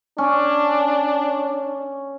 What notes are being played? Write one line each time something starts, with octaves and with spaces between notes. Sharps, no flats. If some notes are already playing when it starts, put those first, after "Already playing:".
C#4 D4